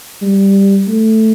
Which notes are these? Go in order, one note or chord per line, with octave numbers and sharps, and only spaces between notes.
G3
A3